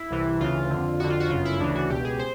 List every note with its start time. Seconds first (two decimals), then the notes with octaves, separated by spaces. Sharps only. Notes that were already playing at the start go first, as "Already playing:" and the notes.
Already playing: E4
0.10 C2 C3 E3
0.40 D2 C#3 E3 F4
0.70 F2 D3
1.00 F2 D3 F#4
1.10 F4
1.20 F#4
1.30 G1 F#2 C#3 F4
1.45 E4
1.60 D2 C#3 E3 D4
1.75 F#4
1.90 C#2 B2 G4
2.04 G#4
2.19 C5